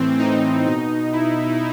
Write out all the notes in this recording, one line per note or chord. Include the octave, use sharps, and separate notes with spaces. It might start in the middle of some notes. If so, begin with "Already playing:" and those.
Already playing: A2 E3 C4
D#4
B2 D#4
E4